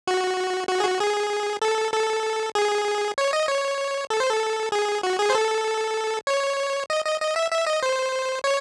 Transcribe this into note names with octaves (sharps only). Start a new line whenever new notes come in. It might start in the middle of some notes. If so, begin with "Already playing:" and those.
F#4
F#4
G#4
F#4
G#4
A4
A4
G#4
C#5
D#5
C#5
A4
C5
A4
G#4
F#4
G#4
C5
A4
C#5
D#5
D#5
D#5
E5
E5
D#5
C5
C#5